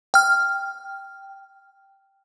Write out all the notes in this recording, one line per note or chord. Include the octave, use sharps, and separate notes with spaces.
G5 F6